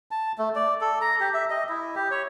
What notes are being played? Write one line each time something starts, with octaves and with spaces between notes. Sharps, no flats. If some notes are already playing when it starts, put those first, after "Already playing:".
A5
A3
D5
A4
A#5
G4
E5
D#5
E4
G4
C#5